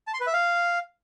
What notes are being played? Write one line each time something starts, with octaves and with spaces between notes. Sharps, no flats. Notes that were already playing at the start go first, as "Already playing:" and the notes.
A5
C6
B4
E5
F5